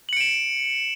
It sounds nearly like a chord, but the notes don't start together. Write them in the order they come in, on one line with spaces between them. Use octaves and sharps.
F#7 C#7 D7 E7